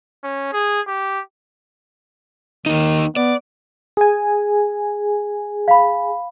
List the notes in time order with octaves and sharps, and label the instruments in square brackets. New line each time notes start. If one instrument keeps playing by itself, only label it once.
[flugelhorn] C#4
G#4
G4
[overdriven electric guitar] D#2 D#4 [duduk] D#3
[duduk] B3 [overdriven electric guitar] D5
[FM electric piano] G#4 G#5
[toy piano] F5 B5